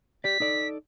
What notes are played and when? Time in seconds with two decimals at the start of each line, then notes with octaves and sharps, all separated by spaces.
0.24 G4 D5 B6
0.40 D#4 A4 D5